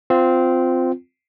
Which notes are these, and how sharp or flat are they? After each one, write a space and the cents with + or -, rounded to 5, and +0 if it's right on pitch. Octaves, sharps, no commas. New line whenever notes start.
C4 -15 F4 +0